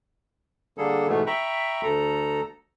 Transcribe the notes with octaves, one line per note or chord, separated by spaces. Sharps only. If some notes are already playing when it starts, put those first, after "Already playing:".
D3 G3 A#3 G#4 A4
G#2 B2 E3 A3 B3
E5 G5 A#5 B5 C#6
D2 A4 A#5